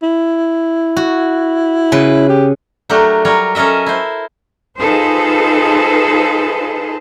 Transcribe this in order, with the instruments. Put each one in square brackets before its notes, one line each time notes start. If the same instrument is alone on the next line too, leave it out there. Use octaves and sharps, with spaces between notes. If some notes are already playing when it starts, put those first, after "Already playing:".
[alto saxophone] E4
[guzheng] F#4
C#3 B4
[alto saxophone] G4
[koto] F#3 A3 D4 G4 A#4
F#3 G3 A#4 C#5
C#4 A4 A#4 D#5 E5
E4 C5
[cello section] D#4 F4 G#4 A4 B4 C5